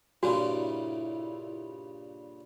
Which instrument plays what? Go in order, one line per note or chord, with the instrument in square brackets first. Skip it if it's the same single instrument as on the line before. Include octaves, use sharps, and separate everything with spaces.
[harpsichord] G2 A#2 C#3 [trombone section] E4 [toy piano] F#4